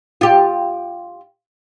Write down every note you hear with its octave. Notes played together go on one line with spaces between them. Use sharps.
F4 G4